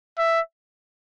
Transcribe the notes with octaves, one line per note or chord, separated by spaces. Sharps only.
E5